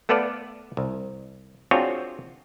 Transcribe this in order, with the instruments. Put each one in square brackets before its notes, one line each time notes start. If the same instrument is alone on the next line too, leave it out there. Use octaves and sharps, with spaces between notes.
[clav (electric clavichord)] A3 B3 A4 B4 D5 F5
C2
C4 D4 F4 F#4 G#4 C#5